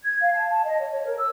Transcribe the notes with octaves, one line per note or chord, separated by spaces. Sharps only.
G#6
F5
A5
A5
D#5
C#5
C#5
A#4
E6